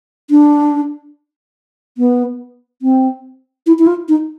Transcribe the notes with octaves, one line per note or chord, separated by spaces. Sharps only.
D4
B3
C4
E4
E4
F4
D#4